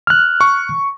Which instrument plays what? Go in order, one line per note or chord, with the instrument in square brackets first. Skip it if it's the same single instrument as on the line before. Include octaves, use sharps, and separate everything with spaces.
[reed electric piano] F6 F#6
[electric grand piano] C#6